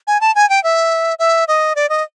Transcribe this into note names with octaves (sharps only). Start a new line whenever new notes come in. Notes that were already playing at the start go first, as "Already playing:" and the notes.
G#5
A5
G#5
G5
E5
E5
D#5
D5
D#5